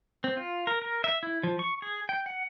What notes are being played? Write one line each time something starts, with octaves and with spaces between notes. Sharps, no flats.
C4
F4
A#4
A#4
E5
E4
F3
C#6
G#4
G5
F#5